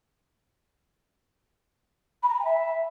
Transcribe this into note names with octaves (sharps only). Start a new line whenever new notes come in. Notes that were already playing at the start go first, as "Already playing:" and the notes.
B5
A#5
B5
G#5
E5